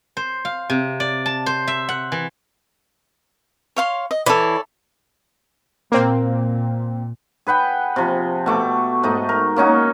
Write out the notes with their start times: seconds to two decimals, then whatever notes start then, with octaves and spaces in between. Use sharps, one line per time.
0.17 C5
0.45 F5
0.70 C3
1.00 D5
1.26 A5
1.46 C5
1.68 E5
1.89 F#5
2.12 E3
3.76 C#5 F5 C6
4.11 D#5
4.26 E3 A4 C#5 D5
5.92 A#2 A#3 C4
7.47 G#4 B4 F#5 G5
7.96 C3 F3
8.46 B2 A3 D6
9.03 G#2 A3 D#4
9.29 A#4
9.56 A#3 C#4 D#4 F#4